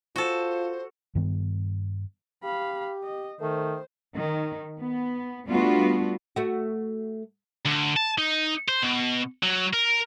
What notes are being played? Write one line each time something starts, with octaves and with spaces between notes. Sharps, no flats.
F4 F#4 A4 C5
G2 D#3 G3 B3
G4 F5 B5
D#5
D#3 A3 C5
D#3
B3
G3 A3 B3 D4 F4 F#4
A3 F#4
D2
A5
D#4
C5
B2
F#3
A#4